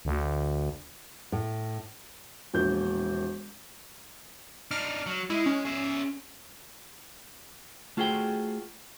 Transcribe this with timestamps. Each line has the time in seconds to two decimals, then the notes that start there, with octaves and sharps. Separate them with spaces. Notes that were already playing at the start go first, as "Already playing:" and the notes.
0.05 D2
1.32 A2
2.54 E1 A#1 G6
4.71 D4 D#4 F6
5.06 F#3
5.30 G#3 E4
5.46 C#4
5.65 G#4 E5
7.97 A3 F4 F#4 G#4 C5 G5